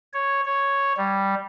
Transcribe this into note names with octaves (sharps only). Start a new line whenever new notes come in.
C#5
C#5
G3